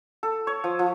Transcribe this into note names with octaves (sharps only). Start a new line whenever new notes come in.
A4
C#5
F3
F3